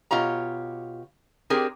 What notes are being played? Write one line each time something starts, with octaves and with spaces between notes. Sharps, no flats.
B2 F4 G4 C#5 A#5
C4 D4 G4 G#4 A#4